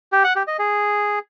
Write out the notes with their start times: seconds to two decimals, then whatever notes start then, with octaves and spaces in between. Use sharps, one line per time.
0.13 G4
0.24 F#5
0.36 G4
0.47 D#5
0.59 G#4